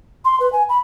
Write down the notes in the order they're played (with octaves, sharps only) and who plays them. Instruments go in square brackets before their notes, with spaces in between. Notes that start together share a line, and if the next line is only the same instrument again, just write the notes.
[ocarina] C6
B4
G#5
B5